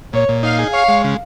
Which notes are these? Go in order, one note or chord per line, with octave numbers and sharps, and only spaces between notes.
A#2 C#5
A#2
D#4 F5
G#4
C#5 F5
G#3
C#3